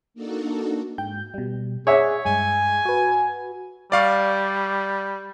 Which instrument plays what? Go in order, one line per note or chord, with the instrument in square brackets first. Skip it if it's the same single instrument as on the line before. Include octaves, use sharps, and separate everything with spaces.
[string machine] A#3 D4 D#4 F#4 A4
[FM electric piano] G#2 G5 G6
B2 G3
[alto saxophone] G#4 [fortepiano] C#5 E5 [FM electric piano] D5 F#5 G#5
[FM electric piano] G2 G#3 [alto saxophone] G#5
[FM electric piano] F#4 B4
[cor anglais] G3 [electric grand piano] D5 F5 C#6